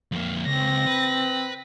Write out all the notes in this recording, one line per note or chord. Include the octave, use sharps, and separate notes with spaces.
F2 A#3
C#2 C4 A#6
B4